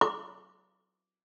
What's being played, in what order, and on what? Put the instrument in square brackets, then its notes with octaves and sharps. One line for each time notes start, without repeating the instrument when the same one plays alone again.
[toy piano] D6